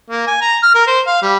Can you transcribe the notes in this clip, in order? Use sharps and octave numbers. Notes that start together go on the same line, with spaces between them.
A#3
G#5
A#5
F6
A#4
C5
F5
G3